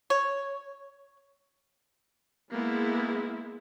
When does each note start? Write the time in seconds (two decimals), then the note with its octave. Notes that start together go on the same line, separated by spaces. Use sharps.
0.10 C#5
2.52 G#3 A#3 B3 E4